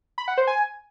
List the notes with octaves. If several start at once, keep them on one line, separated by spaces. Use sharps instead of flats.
B5
F#5
C5
G#5